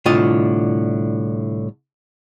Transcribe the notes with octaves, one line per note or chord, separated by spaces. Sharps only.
C2 A2 D3 F4 D#5